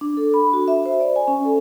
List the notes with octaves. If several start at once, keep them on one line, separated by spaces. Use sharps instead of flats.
D4
A4
B5
F#4
E5
C5
D5
G#5
C#4
A4